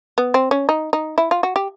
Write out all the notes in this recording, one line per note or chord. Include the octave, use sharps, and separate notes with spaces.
B3
C4
C#4
D#4
D#4
E4
F4
F#4
G4